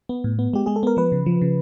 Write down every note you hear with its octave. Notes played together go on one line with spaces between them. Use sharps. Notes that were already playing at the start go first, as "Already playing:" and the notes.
B3
A2
B3
G#3 G4
G#3 G#4
A4
B3 A#4
F3 B4
C#3
F3
C#3